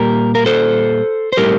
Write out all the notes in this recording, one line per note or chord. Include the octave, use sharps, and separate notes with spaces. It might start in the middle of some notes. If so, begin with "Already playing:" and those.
Already playing: A#2 G3 A#3 G4 A#4
A#4
A4 C5
C5
A2 G3 C4 G4 A#4